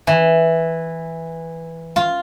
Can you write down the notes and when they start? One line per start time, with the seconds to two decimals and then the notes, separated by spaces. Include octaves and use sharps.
0.07 E3
1.96 F4